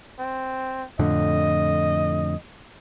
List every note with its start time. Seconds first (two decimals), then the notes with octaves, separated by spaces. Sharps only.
0.19 C4
0.99 F2 A2 D3 D#5